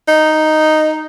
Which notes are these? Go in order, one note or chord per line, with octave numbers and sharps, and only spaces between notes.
D#4